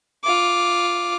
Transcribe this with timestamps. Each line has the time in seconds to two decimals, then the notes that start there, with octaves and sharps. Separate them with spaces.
0.24 F4 D6